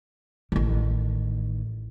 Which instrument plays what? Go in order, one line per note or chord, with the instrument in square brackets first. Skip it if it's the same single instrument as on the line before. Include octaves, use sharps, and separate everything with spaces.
[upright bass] A1 D#3